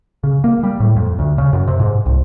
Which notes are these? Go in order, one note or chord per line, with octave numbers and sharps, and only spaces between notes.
C#3
A#3
G3
A2
F2
D2
C#3
F#2
C3
G#2
C2